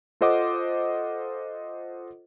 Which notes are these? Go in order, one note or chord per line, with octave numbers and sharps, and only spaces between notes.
F4 A4 C5 D#5 F#5 D6